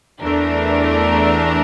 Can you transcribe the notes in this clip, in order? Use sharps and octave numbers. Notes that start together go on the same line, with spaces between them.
E2 E3 A3 D4 A#4